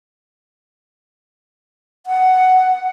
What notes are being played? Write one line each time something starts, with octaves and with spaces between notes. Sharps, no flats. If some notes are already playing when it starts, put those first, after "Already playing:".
F#5